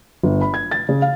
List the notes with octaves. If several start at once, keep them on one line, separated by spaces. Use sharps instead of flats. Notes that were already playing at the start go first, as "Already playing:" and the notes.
G1
B5
G#6
A6
C#3
F5